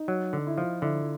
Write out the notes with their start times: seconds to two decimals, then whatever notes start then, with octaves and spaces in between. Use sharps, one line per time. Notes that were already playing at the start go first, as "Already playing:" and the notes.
Already playing: D#4
0.08 F#3
0.33 D3
0.47 E4
0.57 F3 F4
0.82 D3 E4